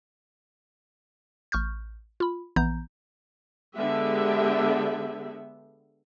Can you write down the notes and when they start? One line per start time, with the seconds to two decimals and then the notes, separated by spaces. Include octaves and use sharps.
1.52 A1 C#6 F6 G6
2.20 F4 B5
2.56 A#1 E3 B3 A#5 G6
3.76 D3 G#3 B3 G4 E5